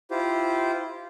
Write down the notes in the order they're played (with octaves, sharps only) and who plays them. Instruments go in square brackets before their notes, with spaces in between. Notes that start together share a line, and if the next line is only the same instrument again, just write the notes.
[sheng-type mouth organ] E4 F4 G4 C5